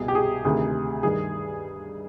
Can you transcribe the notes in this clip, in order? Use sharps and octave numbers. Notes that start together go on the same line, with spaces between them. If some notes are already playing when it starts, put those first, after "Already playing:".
Already playing: C2 B2 G#4
G4
G#4
D2 C3 D#3 G#4
G2 D#3 G#4